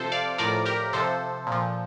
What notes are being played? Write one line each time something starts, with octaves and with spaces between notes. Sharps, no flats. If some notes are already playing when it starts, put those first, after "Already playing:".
Already playing: C3 F3 A4 C5
D5 F5
A2 F3 A#4 D5
G4 A#4
C3 F3 A4 C5
A#2 F3